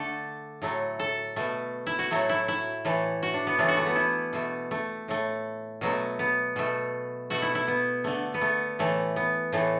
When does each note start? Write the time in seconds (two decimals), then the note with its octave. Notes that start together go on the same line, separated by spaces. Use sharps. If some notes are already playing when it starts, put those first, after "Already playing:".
Already playing: D3 A3 A4
0.62 A2 F#3 A3
0.99 A4
1.36 B2 A3
1.87 E4
1.99 F#4
2.11 A2 F#3 A3
2.29 E4
2.48 E4
2.85 A2 E3 A3
3.23 F#4
3.34 D4
3.47 B3
3.59 A2 E3 A3 D4
3.68 F#4
3.77 A3
3.86 B3
3.96 E4
4.33 B2 A3
4.71 A3
5.08 A2 A3
5.81 B2 F#3 A3
6.19 B3
6.56 B2 A3
7.30 B2 A3 F#4
7.42 E4
7.55 E4
7.68 B3
8.04 D3 A3
8.34 B3
8.41 A3
8.79 A2 E3 A3
9.16 B3
9.53 A2 E3 A3